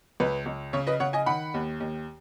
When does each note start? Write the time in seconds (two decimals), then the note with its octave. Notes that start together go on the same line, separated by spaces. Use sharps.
0.20 C#2 B4
0.46 C#2
0.73 C#3 C#5
0.87 B4 D#5
1.00 C#3 C#5 F#5
1.13 D#5 G#5
1.26 D#3 F#5 B5
1.54 D#2
1.80 D#2